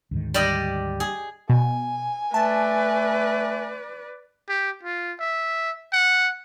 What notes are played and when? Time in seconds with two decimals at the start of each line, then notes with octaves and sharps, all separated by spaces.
0.11 D2 G#2 D#3
0.34 G3 D5 D#5
1.00 G#4
1.50 B2 G#5
2.34 A3 B4 D5 A5
4.49 G4
4.83 F4
5.20 E5
5.93 F#5